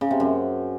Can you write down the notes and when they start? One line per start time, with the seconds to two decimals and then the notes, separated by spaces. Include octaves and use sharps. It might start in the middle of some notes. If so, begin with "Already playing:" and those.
0.01 C#3
0.11 C3
0.20 F#2